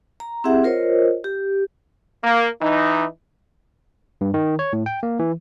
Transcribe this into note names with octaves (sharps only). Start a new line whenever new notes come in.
A#5
C4 E4 G4 G#4 E5 F#5
F4 A#4 C5 C#5 D#5
G4
A#3
E3 D#4
G2
D#3
C#5
A2
G5
A#3
E3